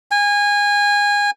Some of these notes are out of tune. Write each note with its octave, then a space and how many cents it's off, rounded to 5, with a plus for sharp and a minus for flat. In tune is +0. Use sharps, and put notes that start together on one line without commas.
G#5 -25